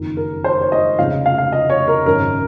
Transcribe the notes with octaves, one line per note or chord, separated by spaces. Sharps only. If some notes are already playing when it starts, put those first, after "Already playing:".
Already playing: F#1 F2 D#3
A#4
C5
C#5
D#5
F1 F2 C#3 F5
F5
F5
D#5
C#5
A#4
G#1 F#2 C#3 A#4